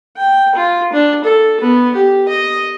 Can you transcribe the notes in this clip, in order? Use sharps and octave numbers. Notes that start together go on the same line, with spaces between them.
G5
F4
D4
A4
B3
G4
D#5